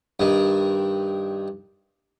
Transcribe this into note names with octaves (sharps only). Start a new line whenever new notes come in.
G2 D#3